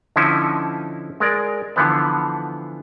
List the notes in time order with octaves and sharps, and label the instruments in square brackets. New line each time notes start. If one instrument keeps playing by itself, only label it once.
[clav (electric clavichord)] D3 F3 C#4 D#4 E4
G#3 A#4 D5
D3 E3 F3 B3